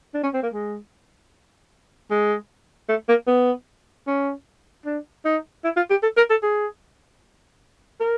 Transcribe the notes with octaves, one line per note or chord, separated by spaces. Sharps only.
D4
C#4
C4
A#3
G#3
G#3
A3
A#3
B3
C#4
D4
D#4
E4
F4
G4
A4
A#4
A4
G#4
A#4